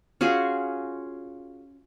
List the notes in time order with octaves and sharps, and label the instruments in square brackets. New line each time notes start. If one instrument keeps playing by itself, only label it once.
[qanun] C#4 F4 F#4 G#4